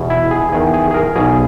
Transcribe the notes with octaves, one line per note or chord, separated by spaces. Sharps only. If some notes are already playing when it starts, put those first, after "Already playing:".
Already playing: E2 B2
E4
G#4
E2 D#3 G#4
G#4
G#4
A#4
B1 B2 G#4